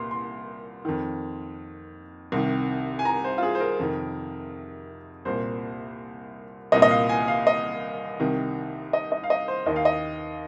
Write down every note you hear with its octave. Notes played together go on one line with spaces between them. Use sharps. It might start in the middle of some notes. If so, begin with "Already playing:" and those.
Already playing: C2 A#2 C6
C6
F2 D#3
C2 C3 D#3
G#5
A#5
C5
F4
G#4
C5
A#4
F2 C3 D#3
C2 A#2 C5
C2 A#2 D#5
D#5
F5
G#5
F5
D#5
C2 C3 D#3
D#5
D#5
F5
D#5
C5
D#2 D#3 D#5
F5
D#5